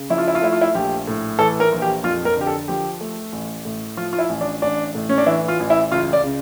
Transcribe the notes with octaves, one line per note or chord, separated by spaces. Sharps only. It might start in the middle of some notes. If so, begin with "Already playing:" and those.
Already playing: C#3
F3 E4
F4
E4
F4
A3 E4
F4
E4
A#1 G4
A2
E3 A4
A#4
A#1
G4
F2 F4
A#4
D3 G4
A4
F3 G4
A3
A1
A2
F3 F4
F4
E4
A1
D4
A1 D4
A2
C#4
D4
E3 E4
F4
A1
E4
C#2 F4
D5
C#3